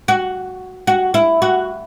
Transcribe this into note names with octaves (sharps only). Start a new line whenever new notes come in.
F#4
F#4
E4
F#4